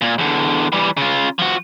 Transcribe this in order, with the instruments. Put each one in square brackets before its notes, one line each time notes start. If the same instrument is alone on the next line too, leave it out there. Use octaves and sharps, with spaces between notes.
[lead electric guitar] A#2
E2 D3
E3 G3
C#3 F4
F3 F#4